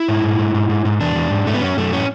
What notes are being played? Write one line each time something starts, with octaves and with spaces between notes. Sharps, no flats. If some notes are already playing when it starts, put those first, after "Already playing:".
Already playing: E4
G#2
G#2
G#2
G#2
G#2
G#2
E2 D4
E2
G#2
G#2 A3
B3
F#2 C#4
F#2 A3
A2 C#4